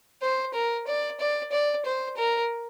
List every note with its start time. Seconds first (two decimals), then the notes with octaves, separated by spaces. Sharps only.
0.22 C5
0.54 A#4
0.88 D5
1.20 D5
1.52 D5
1.85 C5
2.17 A#4